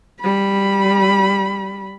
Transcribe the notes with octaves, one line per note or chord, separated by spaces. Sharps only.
G3 B5